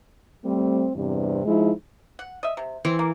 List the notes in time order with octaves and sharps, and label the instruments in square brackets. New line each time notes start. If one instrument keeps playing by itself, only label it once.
[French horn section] G3 A3 C4
E2 G2 C3
F3 G#3 D#4 E4
[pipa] F#5
D#5 E5
C3
[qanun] E3 [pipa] C4
[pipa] A#3